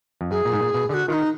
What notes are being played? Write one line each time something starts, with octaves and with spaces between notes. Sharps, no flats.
F2
F#2 G#4
A#2
G#2
A#2
B2
D3 F#4 G#4
D#3 D#4 F4